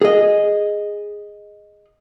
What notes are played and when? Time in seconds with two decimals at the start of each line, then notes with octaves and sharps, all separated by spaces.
0.01 G#4 D#5